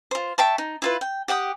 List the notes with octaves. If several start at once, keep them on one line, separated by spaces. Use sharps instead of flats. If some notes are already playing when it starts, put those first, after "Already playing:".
F4 C5
E5 G5 A5 C#6
D#4
E4 F4 B4
G5
G4 F#5 G5 D#6